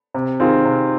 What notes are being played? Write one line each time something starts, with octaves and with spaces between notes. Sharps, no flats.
C3
D#3 C4 F4 G#4
C3